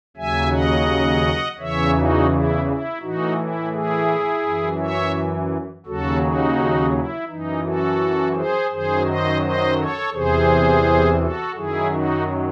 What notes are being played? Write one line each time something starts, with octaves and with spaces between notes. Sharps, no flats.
D#2 C#3 F#3 E5 G#5
D#5 F#5
E2 C#3 E3 C#5 E5
D#4 F#4
E4
E4
A2 E3 D#4 F#4
E4
E4 G#4
F#2 E3
C#5 E5
D#2 C#3 F#3 F#4 A4
D#4 F#4
E4
F#2 E3 D#4
F#4 A4
G#4 C5
F#2 D#3 F#3 G#4 C5
C5 D#5
C5 D#5
A4 C#5
E2 C3 E3 G#4 C5
F#4 A4
F#2 D#3 F#3 E4 G#4
D#4 F#4